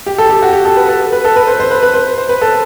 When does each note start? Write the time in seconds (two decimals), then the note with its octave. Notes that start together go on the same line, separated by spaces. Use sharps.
0.06 G4
0.18 A4
0.29 G4
0.42 F#4
0.53 G4
0.65 A4
0.77 B4
0.88 A4
1.13 B4
1.25 A4
1.36 B4
1.47 C5
1.60 C5
1.71 B4
1.83 B4
1.94 C5
2.18 C5
2.29 B4
2.41 A4